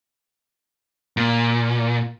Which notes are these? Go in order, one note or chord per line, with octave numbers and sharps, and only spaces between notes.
A#2